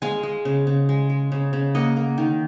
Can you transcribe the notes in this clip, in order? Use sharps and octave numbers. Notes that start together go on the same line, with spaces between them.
G#3 F5 G#5
G#3
C#3
C#3
G#3
G#3
C#3
C#3
A#3 D#5 F#5
A#3
D#3